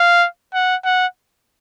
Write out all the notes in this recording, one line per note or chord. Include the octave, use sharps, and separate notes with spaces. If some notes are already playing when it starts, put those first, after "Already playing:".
Already playing: F5
F#5
F#5